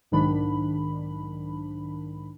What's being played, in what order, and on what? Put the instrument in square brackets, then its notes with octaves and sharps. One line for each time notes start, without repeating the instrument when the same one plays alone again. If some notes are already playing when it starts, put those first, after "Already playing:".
[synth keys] B1 G#2 D#3 D4 B5